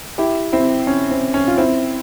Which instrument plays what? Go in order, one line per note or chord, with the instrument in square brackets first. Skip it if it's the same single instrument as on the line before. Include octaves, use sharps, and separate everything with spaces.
[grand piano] E4 G4
C4 E4
C#4
C4
C#4
F4
C4 E4